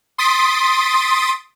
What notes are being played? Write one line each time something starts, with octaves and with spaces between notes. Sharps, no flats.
C6 D#6 A6 B6 D7